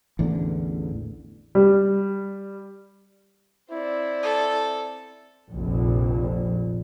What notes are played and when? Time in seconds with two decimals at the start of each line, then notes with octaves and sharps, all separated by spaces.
0.19 A1 E2 D3
1.55 G3
3.71 C4 E4 D5
4.23 A4
5.51 F1 A#1 A#2